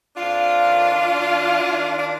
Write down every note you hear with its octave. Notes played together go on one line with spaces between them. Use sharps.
F2 D4 F4
D#3
D#3
D#3
D4